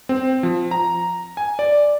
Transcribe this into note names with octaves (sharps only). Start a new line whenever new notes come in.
C4
F3
A#5
G#5
D5